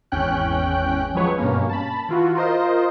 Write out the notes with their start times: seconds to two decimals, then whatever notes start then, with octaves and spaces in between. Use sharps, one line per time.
0.12 G#1 E2 C#4 G5 F#6
1.15 F3 F#3 G#3 B4 C#5
1.38 G2 B2 A#3 C#4
1.69 A5 B5
2.09 E3 F4 F#4
2.35 F4 A#4 C5 D#5